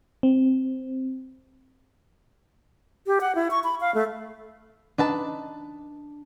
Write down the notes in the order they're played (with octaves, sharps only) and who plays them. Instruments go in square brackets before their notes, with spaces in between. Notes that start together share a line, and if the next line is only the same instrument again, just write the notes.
[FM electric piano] C4
[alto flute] G4
F#5
E4
C#6
B5
F5
A3
[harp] D4 [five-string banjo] D#4 B4 A5